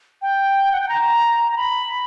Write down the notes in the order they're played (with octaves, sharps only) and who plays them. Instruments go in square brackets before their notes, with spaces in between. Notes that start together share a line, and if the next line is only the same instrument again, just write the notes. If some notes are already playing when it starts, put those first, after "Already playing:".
[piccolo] G5
F#5
G5
A#5
A#5
B5